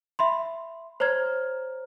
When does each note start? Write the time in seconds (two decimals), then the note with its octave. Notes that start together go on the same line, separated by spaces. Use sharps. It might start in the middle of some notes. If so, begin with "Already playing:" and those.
0.19 E5 B5 C6
1.00 C5 C#5 A#5 F6 G#6